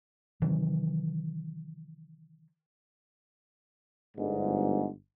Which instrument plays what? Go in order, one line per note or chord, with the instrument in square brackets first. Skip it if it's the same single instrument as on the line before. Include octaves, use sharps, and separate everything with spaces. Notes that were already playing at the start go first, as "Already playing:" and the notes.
[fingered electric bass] C3 D#3 E3 F#3
[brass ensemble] G1 G#2